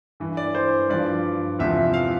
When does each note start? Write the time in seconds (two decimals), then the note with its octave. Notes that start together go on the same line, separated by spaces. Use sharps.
0.20 G2 E3
0.37 D5
0.55 C5
0.90 G2 F3 D5
1.59 E2 C3 F3 E5
1.94 F5